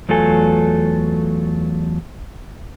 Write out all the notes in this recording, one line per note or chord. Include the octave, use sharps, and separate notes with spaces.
E2 F#3 A3 F4 A4 G#5